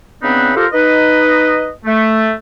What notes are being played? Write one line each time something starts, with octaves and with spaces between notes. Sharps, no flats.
C#3 B3 C4 D4 D#4 B4
F4 G4 A4 A#4 C5
D#4 B4 D#5
A3